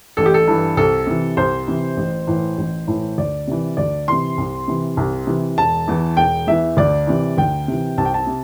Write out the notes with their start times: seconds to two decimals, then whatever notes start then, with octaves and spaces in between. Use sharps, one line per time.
0.17 A1 A4
0.26 G4
0.34 A4
0.47 G2 E3
0.77 C2 A4
1.07 C3 E3
1.37 C2 C5
1.67 C3 E3
1.97 A1
2.27 A2 E3
2.58 A1
2.87 A2 E3
3.18 D2 D5
3.47 C3 E3
3.77 D2 D5
4.08 C3 E3 C6
4.38 C2
4.68 C3 E3
4.97 C2
5.27 C3 E3
5.58 E1 A5
5.88 E2 E3
6.17 E1 G5
6.47 E2 E3 E5
6.77 D2 D5
7.07 C3 E3
7.38 D2 G5
7.68 C3 E3
7.98 C2 A5
8.05 G5
8.14 A5
8.27 C3